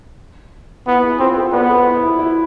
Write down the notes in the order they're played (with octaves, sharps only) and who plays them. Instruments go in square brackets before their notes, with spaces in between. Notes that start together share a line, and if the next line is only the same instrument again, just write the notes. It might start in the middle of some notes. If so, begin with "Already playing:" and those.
[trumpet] B3 [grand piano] E4
[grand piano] E4 G#4
[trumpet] C4 [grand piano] F4 A4
[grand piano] A4 C5
[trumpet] B3 [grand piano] B4 D5
[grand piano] A4 C5
E4
E4
E4